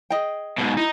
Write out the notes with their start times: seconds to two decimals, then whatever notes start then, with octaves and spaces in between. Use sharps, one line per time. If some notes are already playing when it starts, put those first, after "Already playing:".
0.10 G#4 D#5 G5
0.58 G#2 B2
0.77 D#4 E4